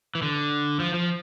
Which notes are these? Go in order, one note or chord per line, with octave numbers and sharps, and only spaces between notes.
E3
D3
F3
F3